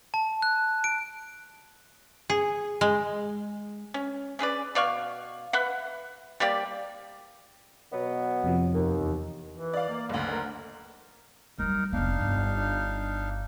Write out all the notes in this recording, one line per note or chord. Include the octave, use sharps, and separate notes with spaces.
A5
F#6
D7
G#4
G#3
C#4
C#4 G#4 B4 D5
B2 D5 F5 C#6
B4 E5 F#5
G3 A#3 G4 D5
B2 F#3 B3
F2 C3 F3
D#2
E2
E3
D5 F5
A#3
F#1 D2
A#4
F#3 G3 D#4 A#4
F1 B3 D4 D#4 F5
G1